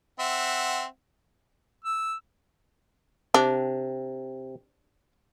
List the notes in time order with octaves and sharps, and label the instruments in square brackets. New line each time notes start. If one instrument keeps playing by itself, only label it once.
[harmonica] C4 E5 F#5
E6
[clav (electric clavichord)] C3 [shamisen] D4